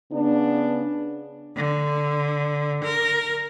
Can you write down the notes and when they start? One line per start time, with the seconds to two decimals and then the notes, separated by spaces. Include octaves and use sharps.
0.12 C#3 B3 D4
1.56 D3
2.85 A#4